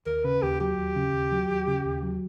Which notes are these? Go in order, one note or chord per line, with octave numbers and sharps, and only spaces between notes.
D#2 A#4
C#3 B4
D#2 G4
F#3 G4
D#2
C#3
D#2
F#3
D#2
C#3
D#2
F#3